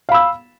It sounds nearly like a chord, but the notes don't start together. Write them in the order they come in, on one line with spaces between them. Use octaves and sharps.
F5 B5 E6